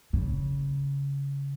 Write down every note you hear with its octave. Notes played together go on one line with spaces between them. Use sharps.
C#3